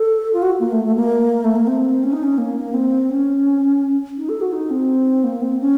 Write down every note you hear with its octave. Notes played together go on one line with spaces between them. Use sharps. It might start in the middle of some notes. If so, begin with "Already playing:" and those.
Already playing: A4
F4
F#4
A#3
A3
A3
A#3
A3
A#3
C4
C#4
D#4
C#4
A#3
A#3
C4
C#4
D#4
A4
F#4
D#4
C4
A#3
C4
C#4